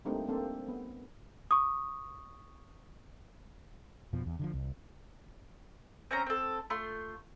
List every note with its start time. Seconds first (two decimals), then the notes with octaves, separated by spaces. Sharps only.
0.05 G3 A3 A#3 C4 D4 D#4
0.28 A#3 C4 D4 A4 C5
0.68 B3
1.51 C#6 D#6
4.13 F2 B2 F3
4.26 E2
4.39 D3 E3 F3
4.54 C2
6.11 C4 C#4 A#5
6.26 C4 A4
6.70 A3 F4 C6